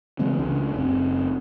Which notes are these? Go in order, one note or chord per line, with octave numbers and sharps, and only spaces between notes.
C#3 E3 G#3 C4
C#2 C#3 D4
F#1 C4